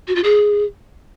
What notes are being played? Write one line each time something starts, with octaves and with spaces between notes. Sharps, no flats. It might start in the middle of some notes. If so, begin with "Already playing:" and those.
F#4
F4
G#4